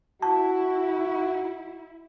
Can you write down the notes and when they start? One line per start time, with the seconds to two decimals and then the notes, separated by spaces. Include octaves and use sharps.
0.22 E4 F#4 A5